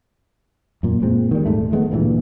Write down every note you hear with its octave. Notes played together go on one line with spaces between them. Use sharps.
F#2 A#2
A#2 G#3 C4
D#3 G3
D#1 G#2 A3
D#3 G#3 A3 B3
D1 G2 A#2 E3